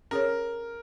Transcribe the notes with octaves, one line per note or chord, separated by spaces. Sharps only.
C#4 G#4 A#4 C#5